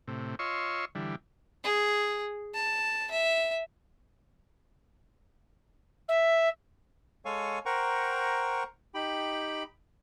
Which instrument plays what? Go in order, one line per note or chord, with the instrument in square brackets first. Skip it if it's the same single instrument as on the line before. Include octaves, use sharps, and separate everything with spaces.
[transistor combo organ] A2 C3
F4 C#5 D#5 C6 C#6 E6
D3 E3 G3
[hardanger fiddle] G#4
A5
E5
[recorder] E5
[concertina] G#3 A4 C#5 F5 G#5 C#6
A#4 C5 F#5 G5 A#5 C#6
D#4 G4 G5 B5